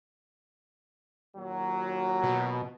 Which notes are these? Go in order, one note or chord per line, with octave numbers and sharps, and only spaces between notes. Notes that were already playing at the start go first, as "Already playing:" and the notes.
D#2 A#2 F#3
B2